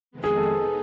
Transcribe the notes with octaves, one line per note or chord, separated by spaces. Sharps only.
F2 C3 D#3 G#3 B3
G#4
A4
B3 D#4